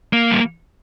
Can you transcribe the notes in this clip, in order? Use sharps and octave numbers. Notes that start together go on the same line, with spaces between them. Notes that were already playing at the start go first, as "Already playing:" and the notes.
A#3
G3